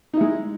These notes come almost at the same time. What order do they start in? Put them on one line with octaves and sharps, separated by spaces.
D#4 E4 G#3